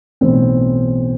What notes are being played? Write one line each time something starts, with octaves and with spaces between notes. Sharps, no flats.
B1 A2 E3 C4 C5